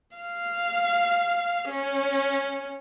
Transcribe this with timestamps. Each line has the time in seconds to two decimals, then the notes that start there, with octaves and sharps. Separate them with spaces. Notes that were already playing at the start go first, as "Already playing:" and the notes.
0.16 F5
1.70 C#4